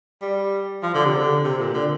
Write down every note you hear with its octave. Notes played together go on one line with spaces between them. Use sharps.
G3
F3
D3
C3
D3
C3
A#2
D3